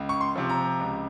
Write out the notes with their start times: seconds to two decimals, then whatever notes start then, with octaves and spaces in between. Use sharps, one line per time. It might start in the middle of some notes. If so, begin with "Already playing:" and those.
Already playing: C#2
0.09 C#6
0.21 C6
0.36 C3 F3
0.49 A#5
0.80 C#2